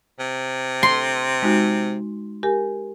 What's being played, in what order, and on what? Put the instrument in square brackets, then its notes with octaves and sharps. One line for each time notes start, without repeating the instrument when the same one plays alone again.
[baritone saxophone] C3
[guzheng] C6
[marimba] G#3 D#4 F#4
G4 A#4 G#5